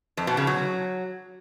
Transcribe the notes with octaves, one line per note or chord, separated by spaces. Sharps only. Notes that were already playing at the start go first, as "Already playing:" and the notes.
F2
B2
C#3
F#3